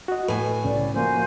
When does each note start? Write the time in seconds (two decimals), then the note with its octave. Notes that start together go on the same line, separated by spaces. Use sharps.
0.08 F#4 D#5
0.28 A2 A4 B4 G#5
0.64 C2 C#3 C#4 D5
0.94 F3 A#3 F#4 C5 G#5